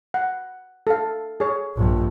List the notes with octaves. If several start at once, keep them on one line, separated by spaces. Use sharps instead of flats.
F#5
A4 F5
G#4 C#5
A#1 G2